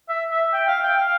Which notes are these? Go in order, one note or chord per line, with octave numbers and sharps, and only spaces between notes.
E5
E5
G5
F5
G5
F5